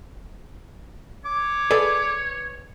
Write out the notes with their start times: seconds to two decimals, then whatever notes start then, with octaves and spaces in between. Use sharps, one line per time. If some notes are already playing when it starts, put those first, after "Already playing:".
1.25 C#5 D6
1.71 G#4 A4 B4 D5